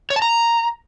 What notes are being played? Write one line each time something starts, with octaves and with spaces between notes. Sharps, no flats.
C#5
A5
A#5